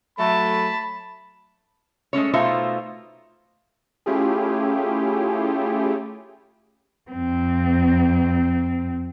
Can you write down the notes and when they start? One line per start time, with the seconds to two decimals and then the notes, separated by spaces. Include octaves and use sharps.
0.19 F#3 A3 A5 B5
2.13 G#3 A3 C#4 C#5
2.33 B2 A3 D#4 F4 C5 E5
4.06 A3 C#4 E4 F4 G4 G#4
7.11 F2 C4